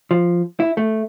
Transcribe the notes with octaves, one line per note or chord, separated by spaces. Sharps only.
F3
E4
A3